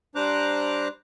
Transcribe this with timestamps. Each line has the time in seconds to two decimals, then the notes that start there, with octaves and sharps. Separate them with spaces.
0.15 G3 D4 C5 A#5 D6 F#6